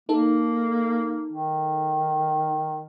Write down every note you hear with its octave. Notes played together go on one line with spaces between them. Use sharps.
A#3 D#4 A4
D#3